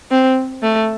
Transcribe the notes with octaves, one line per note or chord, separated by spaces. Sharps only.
C4
A3